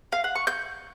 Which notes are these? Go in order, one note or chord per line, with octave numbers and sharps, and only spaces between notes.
F5
F#5
C#6
G6